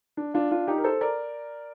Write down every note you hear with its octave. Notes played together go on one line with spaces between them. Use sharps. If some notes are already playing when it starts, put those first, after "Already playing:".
D4
D4 F4
D4 F4
D#4 G4
A#4
A4 C5
A#4 D5